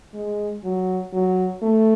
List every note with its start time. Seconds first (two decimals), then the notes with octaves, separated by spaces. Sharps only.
0.14 G#3
0.64 F#3
1.13 F#3
1.63 A3